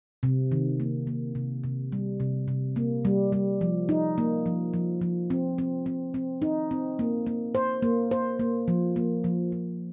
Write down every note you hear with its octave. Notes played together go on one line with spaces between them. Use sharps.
C3
D#3
A#3
A#3
C3
C3
G3
C3
C3
A#3
G3
G3
F3
D#4
A#3
F3
F3
F3
C4
C4
C4
C4
D#4
C4
A#3
A#3
C5
A#3
C5
A#3
F3
A#3
F3
F3